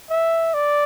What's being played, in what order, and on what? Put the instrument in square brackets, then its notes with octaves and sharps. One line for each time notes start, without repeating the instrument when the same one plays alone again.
[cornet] E5
D5